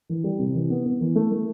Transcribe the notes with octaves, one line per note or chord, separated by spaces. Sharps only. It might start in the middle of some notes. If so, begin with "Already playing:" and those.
E3
G3
C3
E3
B3
B3
E3
A3
A3